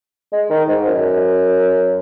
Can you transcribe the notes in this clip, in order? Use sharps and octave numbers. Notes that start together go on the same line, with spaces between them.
G#3
D#3
G#2
F#2